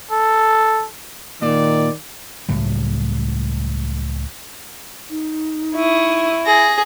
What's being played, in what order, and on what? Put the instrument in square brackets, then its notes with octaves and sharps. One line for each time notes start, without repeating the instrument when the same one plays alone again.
[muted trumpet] A4
[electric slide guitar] A#2 [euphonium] D#3 [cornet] D5
[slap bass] C#2 A2 F#3 G3
[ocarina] D#4
[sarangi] E4 [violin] C#6 D#6
[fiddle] G#4 [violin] A#6